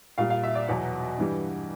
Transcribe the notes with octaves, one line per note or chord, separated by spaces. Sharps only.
A#2 G3 F5
F5
E5
D5
E2 B2 F#3 F#5
G2 E3 G3